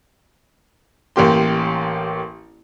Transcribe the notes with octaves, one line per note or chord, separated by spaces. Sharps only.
A1 A#3 G4 C6